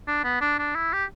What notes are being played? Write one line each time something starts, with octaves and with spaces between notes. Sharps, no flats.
D4
B3
D4
D4
E4
G4